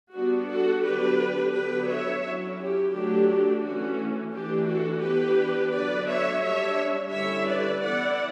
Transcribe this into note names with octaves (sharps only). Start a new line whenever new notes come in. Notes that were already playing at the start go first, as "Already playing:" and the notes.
G3 B3 D4 F#4
F#4 A4
D3 F#3 B3 D4 G4 B4
D3 F#3 B3 G4 B4
C#5 E5
F#3 C#4 E4
G4
D3 F#3 A3 D4 G4
E3 A3 C#4 F#4
E3 A3 D4 G4
F#4 A4
E3 B3 D4 G4 B4
D3 F#3 B3 D4 B4 D5
C#5 E5
G3 D4 C#5 E5
D3 G3 C#4 E4 C#5 E5
B4 D5
E3 B3 E4 D5 F#5